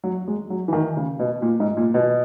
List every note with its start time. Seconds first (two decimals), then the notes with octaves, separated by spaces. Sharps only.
0.04 F#3
0.28 G#3
0.50 F#3
0.68 E3
0.73 D#3
0.97 C#3
1.19 B2
1.42 A#2
1.60 G#2
1.77 A#2
1.94 B2